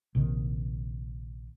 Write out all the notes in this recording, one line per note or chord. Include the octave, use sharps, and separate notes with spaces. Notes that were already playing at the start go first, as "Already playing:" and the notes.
A#1 C3 D#3